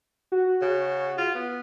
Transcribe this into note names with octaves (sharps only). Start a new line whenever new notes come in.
F#4
C#3
F4
B3